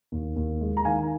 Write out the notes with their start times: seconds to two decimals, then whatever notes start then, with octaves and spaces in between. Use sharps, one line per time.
0.12 D#2
0.36 D#2
0.61 G#3
0.77 A#5
0.85 D#3 F5 G#5